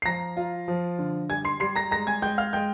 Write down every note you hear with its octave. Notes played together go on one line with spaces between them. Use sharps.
C7
F3 A#5 A#6
F4
F3
D3
G3 G#5 G#6
C6 C7
G3 C6 C7
A#5 A#6
G#3 A#5 A#6
G#5 G#6
G#3 G5 G6
F5 F6
G#3 G5 G6